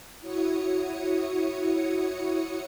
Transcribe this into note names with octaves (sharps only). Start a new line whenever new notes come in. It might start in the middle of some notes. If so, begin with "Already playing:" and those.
E4 F#4 C#5 D#6 C#7